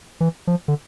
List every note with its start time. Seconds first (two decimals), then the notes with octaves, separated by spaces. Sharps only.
0.20 E3
0.47 F3
0.68 D3